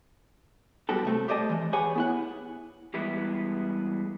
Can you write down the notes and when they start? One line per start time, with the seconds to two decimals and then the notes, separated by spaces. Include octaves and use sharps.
0.89 F#2 G3 B3 F#4 G4 A4
1.05 C3 A3 C4
1.28 G4 C5 D5 D#5 A5
1.50 E3 G#3
1.73 G4 G#4 B4 C#5 F#5 G#5
1.95 B3 E4 F#5
2.94 E3 G3 G#3 B3 E4